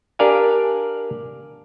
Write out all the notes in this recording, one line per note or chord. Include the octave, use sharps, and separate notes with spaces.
D4 G4 A#4 D5 F5 G#5